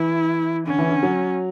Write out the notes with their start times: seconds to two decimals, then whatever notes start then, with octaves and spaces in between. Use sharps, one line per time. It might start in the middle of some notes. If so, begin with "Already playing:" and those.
Already playing: E3 E4
0.67 D3 C#4
0.78 E3
0.89 D3
1.03 F#3